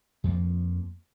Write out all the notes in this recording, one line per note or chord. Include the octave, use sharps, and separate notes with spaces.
F2 F3 G3 A#3